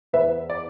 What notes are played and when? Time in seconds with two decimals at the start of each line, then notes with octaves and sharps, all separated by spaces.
0.13 E2 B4 E5
0.50 D5